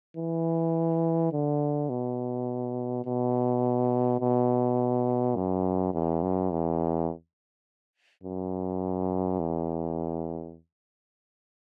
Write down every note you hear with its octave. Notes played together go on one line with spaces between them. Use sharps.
E3
D3
B2
B2
B2
F#2
E2
F#2
E2
F#2
E2